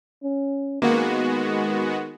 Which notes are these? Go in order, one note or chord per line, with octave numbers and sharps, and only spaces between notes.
C#4
D#3 G#3 A#3 B3 F#4